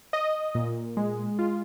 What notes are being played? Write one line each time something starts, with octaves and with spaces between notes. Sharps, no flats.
D#5
A#2
G#3
F4